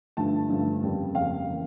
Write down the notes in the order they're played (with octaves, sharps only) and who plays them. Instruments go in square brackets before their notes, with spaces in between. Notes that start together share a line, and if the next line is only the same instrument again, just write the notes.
[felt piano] G2 D3 F3 A3 A5
G2 D3 F3 A3
F2 C#3 G3 A#3
F2 C#3 G3 A#3 F5
E3 A#3 C#4